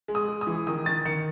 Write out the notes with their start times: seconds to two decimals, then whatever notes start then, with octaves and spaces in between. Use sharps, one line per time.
0.08 G#3
0.15 D#6
0.28 G#3
0.41 D#6
0.47 E3
0.67 D#3 D#6
0.86 D#3 A6
1.05 D#3 C#7